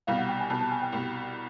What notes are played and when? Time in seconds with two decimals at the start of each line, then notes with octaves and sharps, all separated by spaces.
0.07 C2 B2 G3 F5
0.19 F#5
0.29 G5
0.40 G#5
0.50 C2 B2 G3 A5
0.61 A5
0.72 G#5
0.82 G5
0.92 C2 B2 G3